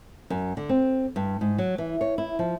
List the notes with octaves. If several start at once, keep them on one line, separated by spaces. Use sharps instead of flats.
F#2
D3
C4
G2
G#2
F#3
E3
C#5
E4
F3